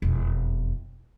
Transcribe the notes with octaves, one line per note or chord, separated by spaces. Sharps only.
E1 F2